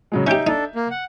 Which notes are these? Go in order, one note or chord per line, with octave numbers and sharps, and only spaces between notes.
C#3 F#3 G#3
C#4 D#4 G4 E5 G6 D7
D4 D#4 A4
A#3
F#5